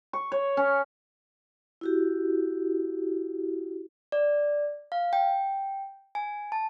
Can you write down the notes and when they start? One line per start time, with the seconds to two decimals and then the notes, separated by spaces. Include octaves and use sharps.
0.13 C#6
0.32 C#5
0.57 C#4
1.81 E4 F#4 G4
4.12 D5
4.92 F5
5.13 G5
6.15 G#5
6.52 A5